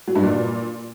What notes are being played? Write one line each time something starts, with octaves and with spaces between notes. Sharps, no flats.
F#3
G2
A#2